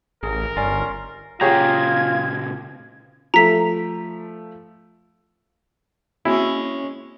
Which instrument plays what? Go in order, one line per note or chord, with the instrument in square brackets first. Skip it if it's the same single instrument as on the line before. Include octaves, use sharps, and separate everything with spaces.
[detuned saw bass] A1 [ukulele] G#4 [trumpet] A#4
[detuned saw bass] G1 [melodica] C#4 C6 [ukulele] C#5 D5 G#5
[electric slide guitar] A#2 C#3 A#5 [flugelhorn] F4 [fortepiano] G4 G#4 C#5 [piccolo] G#6
[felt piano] F3 A3 [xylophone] A#5 B6
[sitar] G#3 C#4 [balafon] A#3 C4 F#4 [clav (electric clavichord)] E4